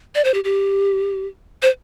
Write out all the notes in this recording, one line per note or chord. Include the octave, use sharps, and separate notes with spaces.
D5
C5
G4
G4
C5